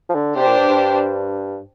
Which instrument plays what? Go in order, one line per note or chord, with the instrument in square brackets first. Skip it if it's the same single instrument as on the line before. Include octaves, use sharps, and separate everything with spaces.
[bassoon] F3
D3
[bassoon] C3 [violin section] D4 G4 C5
[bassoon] A#2
G2
G2